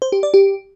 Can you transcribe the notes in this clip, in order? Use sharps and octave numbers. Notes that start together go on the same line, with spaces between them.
C5
G4
D5
G4